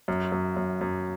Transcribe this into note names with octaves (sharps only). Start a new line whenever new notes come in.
F#2
F#2
F#2
F#2